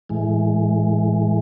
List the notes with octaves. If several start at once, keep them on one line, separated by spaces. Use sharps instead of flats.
A2 E3 G#3